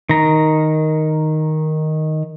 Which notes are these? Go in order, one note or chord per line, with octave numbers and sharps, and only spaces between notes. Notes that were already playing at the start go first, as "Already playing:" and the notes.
D#3 A#5